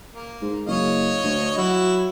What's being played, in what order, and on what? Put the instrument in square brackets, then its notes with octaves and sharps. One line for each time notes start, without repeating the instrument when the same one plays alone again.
[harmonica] A#3
[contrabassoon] G#2
[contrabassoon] F#1 [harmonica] C#5 D#5 F5
[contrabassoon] D2
[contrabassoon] F#3 [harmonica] E4 F#4